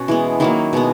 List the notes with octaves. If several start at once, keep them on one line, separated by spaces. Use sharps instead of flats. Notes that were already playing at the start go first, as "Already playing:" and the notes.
Already playing: B2 C#4 F#4
E3 G#3 B3
D#3 F#3 A#3 E4
B2 G#3 B3